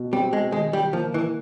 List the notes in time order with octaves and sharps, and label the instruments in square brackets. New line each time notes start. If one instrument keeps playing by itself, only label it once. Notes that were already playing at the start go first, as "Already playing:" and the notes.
Already playing: [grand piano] B2
[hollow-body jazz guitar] G3 [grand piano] C4
[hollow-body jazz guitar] G#3
[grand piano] D#3 [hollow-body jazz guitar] G#3
[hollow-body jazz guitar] G3
[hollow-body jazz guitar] F3 [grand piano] A#3
[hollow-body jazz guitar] E3